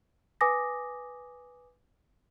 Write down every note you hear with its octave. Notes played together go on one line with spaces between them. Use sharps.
B4 G#5 D6 D#6 A#6